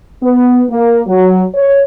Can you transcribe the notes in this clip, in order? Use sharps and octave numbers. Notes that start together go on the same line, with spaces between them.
B3
A#3
F#3
C#5